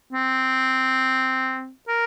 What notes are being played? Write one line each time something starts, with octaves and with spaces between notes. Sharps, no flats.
C4
A#4